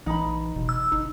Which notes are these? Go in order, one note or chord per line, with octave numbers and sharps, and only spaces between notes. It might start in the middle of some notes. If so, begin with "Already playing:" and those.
A#1 E3 D#4 B5
F#1 B2
E6
G1 D#4